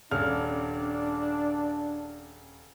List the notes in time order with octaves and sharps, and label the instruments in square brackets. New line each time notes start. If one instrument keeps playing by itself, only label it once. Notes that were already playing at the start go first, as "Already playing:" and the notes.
[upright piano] D#1 C#3 F6 [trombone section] D4